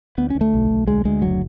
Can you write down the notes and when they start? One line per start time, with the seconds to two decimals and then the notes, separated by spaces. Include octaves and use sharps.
0.18 D2 B3
0.30 D2 C#4
0.41 A3
0.54 B1
0.71 B1
0.87 D2 G#3
1.05 D2 G#3
1.22 F#1 F#3